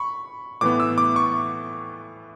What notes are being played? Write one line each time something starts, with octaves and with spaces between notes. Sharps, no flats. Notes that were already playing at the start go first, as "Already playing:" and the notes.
Already playing: B5 C#6
A2 E3 B3 D6
E6
D6
C#6